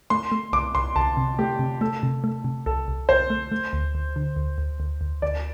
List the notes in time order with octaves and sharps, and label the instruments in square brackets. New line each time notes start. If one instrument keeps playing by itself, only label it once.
[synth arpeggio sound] A3 [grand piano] C6
[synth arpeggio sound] A3
[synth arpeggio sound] C2 [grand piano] D6
[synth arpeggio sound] C2 [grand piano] C6
[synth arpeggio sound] C2 [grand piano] A5
[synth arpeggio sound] C3
[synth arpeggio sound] A3 [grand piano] G4
[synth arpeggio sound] C3
[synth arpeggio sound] A3 [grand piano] A4
[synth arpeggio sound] C3
A3
C3
[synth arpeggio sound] C2 [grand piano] A4
[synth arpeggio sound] C2
[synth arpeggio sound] C2 [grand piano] C5
[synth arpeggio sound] A3
A3
D2
D2
D3
D2
D2
D2
D2
[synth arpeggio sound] D2 [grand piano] D5